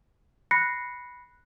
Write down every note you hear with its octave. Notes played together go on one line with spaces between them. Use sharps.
B5 F#6 A#6 C7 C#7